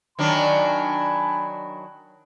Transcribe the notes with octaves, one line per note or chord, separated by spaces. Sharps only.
D#3 F#3 D4 G#5 A5 B5